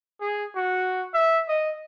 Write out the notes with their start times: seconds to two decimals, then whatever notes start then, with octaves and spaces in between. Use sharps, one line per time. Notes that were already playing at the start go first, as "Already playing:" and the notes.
0.21 G#4
0.56 F#4
1.14 E5
1.49 D#5